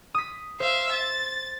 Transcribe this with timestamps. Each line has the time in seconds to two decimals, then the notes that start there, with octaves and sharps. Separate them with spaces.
0.14 D#6 B6
0.60 C5 E5 F5
0.92 A6